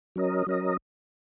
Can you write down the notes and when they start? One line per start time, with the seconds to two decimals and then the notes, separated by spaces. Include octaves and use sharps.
0.16 F#3 C#4 A#4 D#5
0.47 F#3 C#4 A#4 D#5